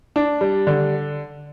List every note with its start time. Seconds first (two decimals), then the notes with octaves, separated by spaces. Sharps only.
0.16 D4
0.41 G3
0.67 D3